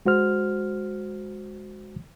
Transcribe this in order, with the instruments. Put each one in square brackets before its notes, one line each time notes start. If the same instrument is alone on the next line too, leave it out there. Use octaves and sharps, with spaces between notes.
[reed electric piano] G#3 F#4 C5 F6